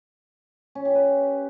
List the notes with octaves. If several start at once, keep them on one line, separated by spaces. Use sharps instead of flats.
C#4
G4
B4